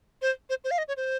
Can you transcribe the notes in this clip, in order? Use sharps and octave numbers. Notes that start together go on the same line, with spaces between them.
C5
C5
C5
F5
D#5
C#5
C5